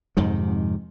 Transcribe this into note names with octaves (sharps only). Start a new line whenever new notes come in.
F2 G#2 C3 D#3